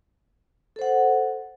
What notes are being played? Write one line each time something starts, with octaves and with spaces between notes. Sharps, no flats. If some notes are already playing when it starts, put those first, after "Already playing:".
A4 C5 F#5